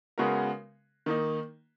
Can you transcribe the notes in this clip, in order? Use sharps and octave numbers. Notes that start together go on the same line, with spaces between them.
C#3 G#3 B3 F#4 A#4
D#3 A#3 D#4